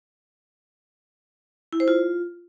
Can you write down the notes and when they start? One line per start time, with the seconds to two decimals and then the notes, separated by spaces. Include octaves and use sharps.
1.73 E4
1.80 C5
1.88 F4